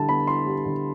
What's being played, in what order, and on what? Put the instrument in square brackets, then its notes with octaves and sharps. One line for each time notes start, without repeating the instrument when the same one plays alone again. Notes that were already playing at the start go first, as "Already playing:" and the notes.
Already playing: [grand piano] D3 G3 E4 A5
B3 B5
E4 C6
G3
D3